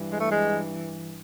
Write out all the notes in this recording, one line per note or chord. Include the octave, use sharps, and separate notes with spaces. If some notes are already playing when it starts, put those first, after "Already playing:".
Already playing: G2 E3
G#3
A3
G#3